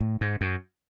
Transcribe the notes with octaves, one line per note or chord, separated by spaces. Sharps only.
A2
G#2
F#2